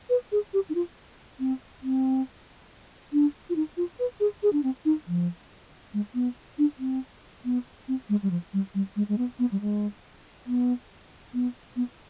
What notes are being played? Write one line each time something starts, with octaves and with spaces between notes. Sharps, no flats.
B4
G#4
G4
D#4
F4
C4
C4
D4
F4
D#4
F4
B4
G#4
G#4
D4
C4
D#4
F3
G#3
B3
D4
C4
B3
C4
G#3
G3
F3
G3
G3
G#3
G#3
B3
B3
G3
G#3
B3
B3
B3